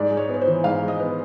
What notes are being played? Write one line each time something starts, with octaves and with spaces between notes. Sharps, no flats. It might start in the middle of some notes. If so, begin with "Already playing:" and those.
Already playing: G#2 D5
G#3
C#5
B3 B4
C5
E3
G#2 F5
G#3
D#5
B3